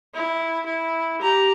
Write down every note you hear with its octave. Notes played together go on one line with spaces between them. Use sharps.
E4
E4
G4 A#5